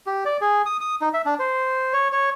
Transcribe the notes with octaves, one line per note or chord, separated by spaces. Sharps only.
G4
D5
G#4
D#6
D#6
D#4
E5
D4
C5
C#5
C#5